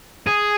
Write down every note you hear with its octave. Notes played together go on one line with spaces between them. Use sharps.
G#4